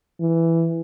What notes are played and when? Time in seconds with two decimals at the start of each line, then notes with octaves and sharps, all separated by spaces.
0.20 E3